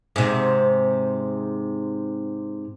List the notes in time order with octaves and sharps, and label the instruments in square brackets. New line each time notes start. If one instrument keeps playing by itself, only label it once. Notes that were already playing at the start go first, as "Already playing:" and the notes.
[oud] G#2 C3